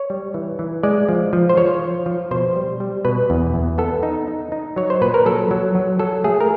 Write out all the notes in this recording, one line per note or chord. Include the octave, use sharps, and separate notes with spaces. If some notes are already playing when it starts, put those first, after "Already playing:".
Already playing: C#5
G3
E3
E3
G#3 D5
F3
F3
C5
F3 C#5
F3
F3
B2 C5
G3
G3
B2 B4
E2
E2
B3 A4
D#4
D#4
D#4
F#3 C#5
C5
A#2 B4
A#4
F#3 A4
F#3
F#3
F#3 A4
A3 G#4
A#4